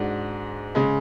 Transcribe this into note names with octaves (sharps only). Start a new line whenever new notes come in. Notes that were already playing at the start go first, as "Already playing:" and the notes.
Already playing: G#2 G#3 D4 F#4
C#3 G#3